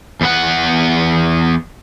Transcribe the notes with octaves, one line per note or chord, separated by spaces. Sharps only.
E2 B3 F#5